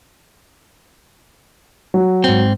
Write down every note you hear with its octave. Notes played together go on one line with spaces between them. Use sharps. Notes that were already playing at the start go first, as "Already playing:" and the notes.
F#3
G#2 C4